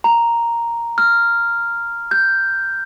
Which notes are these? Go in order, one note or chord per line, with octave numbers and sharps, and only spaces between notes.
A#5
F6
G6